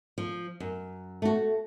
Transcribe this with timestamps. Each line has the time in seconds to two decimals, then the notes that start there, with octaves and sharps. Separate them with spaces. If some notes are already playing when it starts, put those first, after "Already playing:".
0.18 F3
0.60 F#2
1.22 A3 F#4